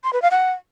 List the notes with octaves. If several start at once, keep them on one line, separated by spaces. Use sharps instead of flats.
C6
B4
F5
F#5